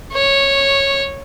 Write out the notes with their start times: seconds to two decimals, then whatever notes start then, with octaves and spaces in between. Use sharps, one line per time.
0.13 C#5